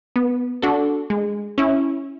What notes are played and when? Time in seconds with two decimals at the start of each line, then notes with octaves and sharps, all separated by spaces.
0.16 B3
0.62 D4 F#4 A4
1.10 G#3
1.58 C#4 E4